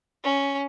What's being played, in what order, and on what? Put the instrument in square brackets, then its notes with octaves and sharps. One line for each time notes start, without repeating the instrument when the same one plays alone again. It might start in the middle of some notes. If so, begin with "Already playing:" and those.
[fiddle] C#4